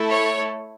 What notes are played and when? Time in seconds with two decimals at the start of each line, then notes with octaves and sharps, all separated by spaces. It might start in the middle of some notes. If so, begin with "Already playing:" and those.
Already playing: A3 E4 A4
0.09 C#5